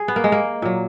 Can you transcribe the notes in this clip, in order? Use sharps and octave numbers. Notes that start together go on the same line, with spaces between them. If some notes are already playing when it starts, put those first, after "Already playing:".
Already playing: G#4
B3
A#3
G#3
A#3
A#2 F#3